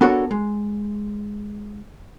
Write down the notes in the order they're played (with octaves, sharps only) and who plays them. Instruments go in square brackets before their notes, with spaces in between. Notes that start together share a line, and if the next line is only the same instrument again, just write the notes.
[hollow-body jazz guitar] B3 D4 F#4 A4 A#4 C#5
G#3